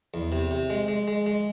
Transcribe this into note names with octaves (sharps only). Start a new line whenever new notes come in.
E2
C3
C3
G#3
G#3
G#3
G#3